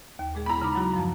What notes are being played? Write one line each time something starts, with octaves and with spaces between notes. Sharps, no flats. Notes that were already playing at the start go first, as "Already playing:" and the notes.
D#2
A#2 G#3 G#4
B3 E4 A#5 B5
C#3 D#4 D6
F#3 E4 F#4
F#2 F3 A5